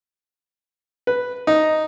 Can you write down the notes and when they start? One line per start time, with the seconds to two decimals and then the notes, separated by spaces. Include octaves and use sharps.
1.07 B4
1.47 D#4